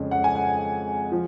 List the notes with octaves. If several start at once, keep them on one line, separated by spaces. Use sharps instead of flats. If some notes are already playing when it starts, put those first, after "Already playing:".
Already playing: F2 C#3 G#3 C#4
F#5
G#5
F#5
F3